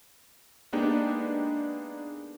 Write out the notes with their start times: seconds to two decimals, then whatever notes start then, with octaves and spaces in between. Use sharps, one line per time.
0.73 G#3 A#3 B3 D4 D#4 G4